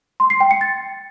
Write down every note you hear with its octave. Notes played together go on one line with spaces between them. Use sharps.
C6
C7
G5
C#7
A6